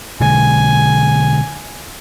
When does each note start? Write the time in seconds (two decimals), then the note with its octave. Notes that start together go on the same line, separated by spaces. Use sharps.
0.21 B2 D3 G#3 G#5